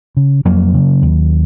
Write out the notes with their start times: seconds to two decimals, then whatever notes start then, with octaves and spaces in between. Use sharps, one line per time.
0.17 C#3
0.45 F2 F#3 A#3
0.73 C#3
1.02 D#2